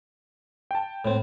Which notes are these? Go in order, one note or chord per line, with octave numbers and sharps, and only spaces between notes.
G5 A5
A2 C4